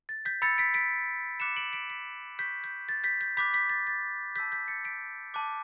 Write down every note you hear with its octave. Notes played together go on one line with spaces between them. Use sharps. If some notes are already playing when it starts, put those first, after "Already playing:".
A6
G6 B6
B5 E6 G6 A6 C#7
B6 D7
B6 D7
B5 D6 F#6 C#7 E7
D7 F#7
B6 D7
B6 D7
C#6 F#6 G6 B6
G6
A6
G6 B6
G6
B5 D6 F#6 G6 B6
G6 B6
A6
A6
A5 E6 G6 B6
G6 B6
A6 C#7
B6 D7
A5 D6 F#6